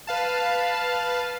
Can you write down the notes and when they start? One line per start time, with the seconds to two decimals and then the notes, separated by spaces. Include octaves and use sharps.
0.07 B4 F5 A5